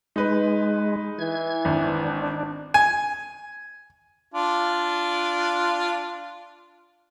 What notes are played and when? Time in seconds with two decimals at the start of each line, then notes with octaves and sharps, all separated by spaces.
0.16 G#3 D#4 B4
1.19 E3 G#6
1.65 G#1 D4
2.74 G#5
4.34 D4 F4